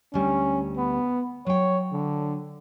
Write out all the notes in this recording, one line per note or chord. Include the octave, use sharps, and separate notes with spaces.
D2 G3 C#4
B3
F#3 C#5 G5
D3